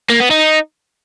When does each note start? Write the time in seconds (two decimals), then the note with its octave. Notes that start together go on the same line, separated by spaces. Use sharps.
0.10 A#3
0.20 B3
0.31 D#4